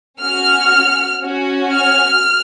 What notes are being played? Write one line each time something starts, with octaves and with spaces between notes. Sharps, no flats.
C#4 F#4 F6
C#4 F#4
F6